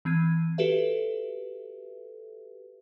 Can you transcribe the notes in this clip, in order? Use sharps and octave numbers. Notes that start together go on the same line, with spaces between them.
E3 C4 G#6 D#7
F#4 G4 A4 B4 E5